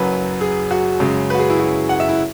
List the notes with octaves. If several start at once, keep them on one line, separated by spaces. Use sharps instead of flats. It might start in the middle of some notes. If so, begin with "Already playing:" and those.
Already playing: F#1 F#2 F#3 B4
G#4
F#4
F#2 C#3 G#3
F#4 B4
G#4
E4
F#4
F#5
E5
E4